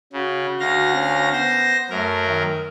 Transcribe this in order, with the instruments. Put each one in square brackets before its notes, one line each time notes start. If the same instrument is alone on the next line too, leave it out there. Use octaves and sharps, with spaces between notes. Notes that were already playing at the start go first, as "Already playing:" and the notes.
[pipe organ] C#3 [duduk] F#4
[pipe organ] D2 F5 A#6
[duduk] C#4
[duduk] B3 [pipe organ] C5 A#6
[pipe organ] F#2 A#4 [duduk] A3
[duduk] D#3